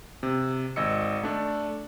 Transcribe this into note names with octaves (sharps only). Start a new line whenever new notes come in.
C3
G#1 D#5 E6 C#7
A3 D4